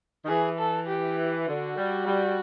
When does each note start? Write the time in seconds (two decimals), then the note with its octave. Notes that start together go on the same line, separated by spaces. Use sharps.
0.24 D#3
0.28 E3 G#4
0.59 A4
0.87 G4
1.47 D3 F#4
1.76 G3
2.06 G3